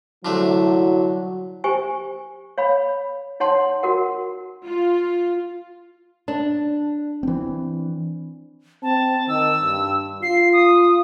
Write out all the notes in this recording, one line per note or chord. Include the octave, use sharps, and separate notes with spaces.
C2 D3 F#3 A3 E4
G4 C5 G#5 C#6
C#5 F5 B5
D#4 C#5 F#5 A5 C6
F#4 A#4 F#5
F4
D4
E3 C4
C4 A5
D#3 E6
G2
F4 C7
D#6